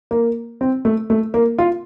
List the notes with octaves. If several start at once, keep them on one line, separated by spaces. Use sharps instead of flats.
A#3
C4
A3
A3
A#3
F4